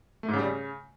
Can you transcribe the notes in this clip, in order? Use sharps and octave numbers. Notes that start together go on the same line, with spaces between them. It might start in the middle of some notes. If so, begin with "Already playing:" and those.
A3
G#2
C#3
G3
C#3